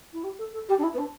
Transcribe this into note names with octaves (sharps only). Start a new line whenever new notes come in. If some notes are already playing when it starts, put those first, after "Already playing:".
E4
G4
A4
A4
G4
D4
E4
B3
D4